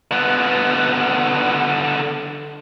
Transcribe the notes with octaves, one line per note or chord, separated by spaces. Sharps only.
D3 B3